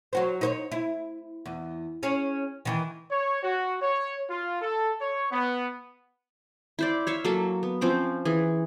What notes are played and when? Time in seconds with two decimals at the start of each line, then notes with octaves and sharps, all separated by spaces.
0.13 F#3 F#4 C5
0.41 D#4 C5 C#5
0.72 E4
1.46 E2
2.03 C#4 G#4 C#5
2.65 D#3 E3
3.11 C#5
3.43 F#4
3.81 C#5
4.30 F4
4.61 A4
5.01 C#5
5.32 B3
6.79 E4 C5 D5
7.07 C#5 E5 F5
7.25 F#3 A#3 A4
7.63 B3
7.81 F3 C4 C#4 D6
8.25 E3 G#4